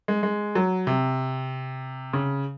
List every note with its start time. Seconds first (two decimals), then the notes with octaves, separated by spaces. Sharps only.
0.08 G#3
0.23 G#3
0.55 F#3
0.87 C3
2.13 C#3